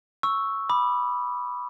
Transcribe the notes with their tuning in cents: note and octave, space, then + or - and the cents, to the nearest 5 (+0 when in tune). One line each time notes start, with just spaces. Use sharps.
C#6 +0 E6 +0
B5 -5 D6 +35